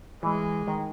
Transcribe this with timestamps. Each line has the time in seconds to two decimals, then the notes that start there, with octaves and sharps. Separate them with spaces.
0.23 E3 G#3
0.68 D#3